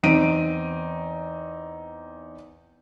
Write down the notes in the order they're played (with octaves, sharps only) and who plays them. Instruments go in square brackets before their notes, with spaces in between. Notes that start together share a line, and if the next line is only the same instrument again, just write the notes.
[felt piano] E2 C4 D#4 D7 D#7